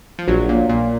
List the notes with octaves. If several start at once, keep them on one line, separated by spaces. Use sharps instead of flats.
F3
A#1 F#3
A#2
A#2